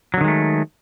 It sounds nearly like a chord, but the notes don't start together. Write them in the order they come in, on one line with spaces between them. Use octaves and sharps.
F#3 D3 D#3 G#3 A3